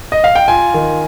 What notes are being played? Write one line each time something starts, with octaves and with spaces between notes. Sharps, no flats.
D#5
F5
G5
F4 G#5
D#3